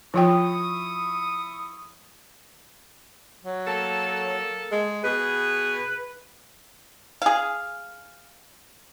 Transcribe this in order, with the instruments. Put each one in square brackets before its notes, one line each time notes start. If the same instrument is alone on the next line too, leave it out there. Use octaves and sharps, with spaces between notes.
[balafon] F3 F4 G5 [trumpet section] E4 C#6 D#6
[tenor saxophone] F#3
[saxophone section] A#3 A4
[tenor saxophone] G#3
[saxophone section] B2 B3 G#4 [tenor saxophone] B4
[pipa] G#4 F5